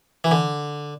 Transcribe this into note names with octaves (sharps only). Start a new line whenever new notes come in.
E3
D3